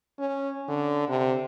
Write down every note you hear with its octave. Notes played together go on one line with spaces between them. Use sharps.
C#4
D3
C3